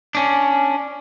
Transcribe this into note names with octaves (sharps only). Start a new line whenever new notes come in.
C#4 D4